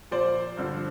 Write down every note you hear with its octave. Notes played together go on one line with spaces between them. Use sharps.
A#2 F3 C5 D5
G2 D3 F3